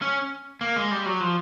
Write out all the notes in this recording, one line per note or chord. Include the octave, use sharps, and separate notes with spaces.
C#4
A#3
G#3
G3
F#3
F3